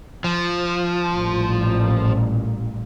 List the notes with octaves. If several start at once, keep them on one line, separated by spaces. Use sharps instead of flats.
F3
A1 A#2 G3